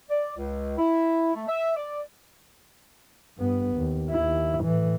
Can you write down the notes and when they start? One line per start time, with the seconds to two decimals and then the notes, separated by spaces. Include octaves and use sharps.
0.10 D5
0.37 C#2
0.78 E4
1.34 A3
1.48 E5
1.76 D5
3.38 G2 B3
3.76 D#2
4.10 D#2 E4
4.64 A2 E3